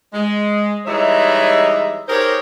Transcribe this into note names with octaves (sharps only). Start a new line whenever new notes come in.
G#3
E3 G3 G#3 D#4 C#5 E5
D#4 G4 G#4 A#4 C5 C#5